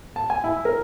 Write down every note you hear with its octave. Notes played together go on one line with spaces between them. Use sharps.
A5
G#5
E4
A#4